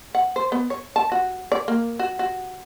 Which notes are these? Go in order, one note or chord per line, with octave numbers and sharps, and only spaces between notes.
F#5
C5
B3
C#5
A5
F#4
D5
A#3
F#4
F#4